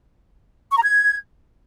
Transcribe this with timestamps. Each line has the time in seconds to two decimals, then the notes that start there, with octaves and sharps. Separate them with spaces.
0.70 C#6
0.77 A#5
0.83 G#6